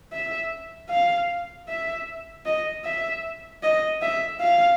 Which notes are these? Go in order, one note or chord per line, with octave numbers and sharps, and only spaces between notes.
E5
F5
E5
D#5
E5
D#5
E5
F5